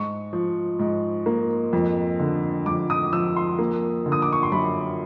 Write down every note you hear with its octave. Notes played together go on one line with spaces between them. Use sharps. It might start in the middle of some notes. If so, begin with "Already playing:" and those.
Already playing: G#2 C#6
F3
G#2
A#3
F2
D3
F2 D6
D#6
F3 E6
C6
A#3
D3
D#6
D6
C#6
C6
F#2 B5